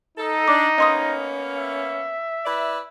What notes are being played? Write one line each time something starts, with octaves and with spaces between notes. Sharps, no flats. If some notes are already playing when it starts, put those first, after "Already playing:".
D#4 A4
D4 D6
A#3 B3 C#4 D#5 C6 D#6
E5
E4 B4 D5